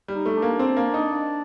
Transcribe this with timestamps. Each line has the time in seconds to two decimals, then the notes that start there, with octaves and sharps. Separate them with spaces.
0.08 G3
0.14 D#4
0.26 A3
0.37 D4
0.42 A#3
0.59 C4
0.77 A#3
0.94 D#4